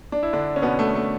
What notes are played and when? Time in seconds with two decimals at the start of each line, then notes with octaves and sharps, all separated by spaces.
0.12 D4
0.23 E4
0.33 D3 D4
0.56 C#4
0.62 B2 B3
0.79 A3
0.95 A3